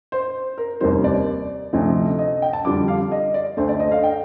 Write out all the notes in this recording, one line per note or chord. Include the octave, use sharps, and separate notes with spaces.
C5
A#4
F1 D#2 D#3 G3 C5
D5
D2 C3 F3 A3 D#4
D#5
G5
A5
F2 D3 G3 D4 D6
F5
D#5
D5
D2 D3 A3 C5
D5
D#5
F5
G5